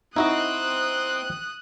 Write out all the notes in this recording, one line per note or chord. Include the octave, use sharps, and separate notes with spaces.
C4 D#4 E4 F#4 D#5 D#6 F#6